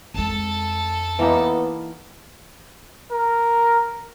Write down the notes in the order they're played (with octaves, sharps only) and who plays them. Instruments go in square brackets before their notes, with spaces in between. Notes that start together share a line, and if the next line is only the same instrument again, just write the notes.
[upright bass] F2 G#3 [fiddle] A4 A5
[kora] E3 A#3 D#4 [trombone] B3
[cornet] A#4